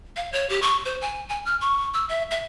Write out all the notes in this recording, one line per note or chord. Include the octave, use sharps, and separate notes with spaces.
F5
C#5
G4
C#6
C5
G#5
G#5
F6
C#6
E6
E5
E5